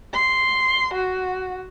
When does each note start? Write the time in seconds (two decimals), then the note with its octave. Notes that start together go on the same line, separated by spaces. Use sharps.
0.14 C6
0.94 F#4